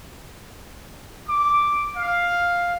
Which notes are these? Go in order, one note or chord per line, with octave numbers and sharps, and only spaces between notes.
D6
F5